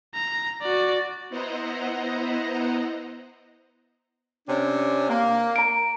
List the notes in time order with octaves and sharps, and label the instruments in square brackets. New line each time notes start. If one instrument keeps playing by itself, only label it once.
[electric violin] A#5
F#4 D5
[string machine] B3 E4 C5 D#5 F#5 A#5
[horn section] C3 C#4 D4
A#3
[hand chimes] A#5 D7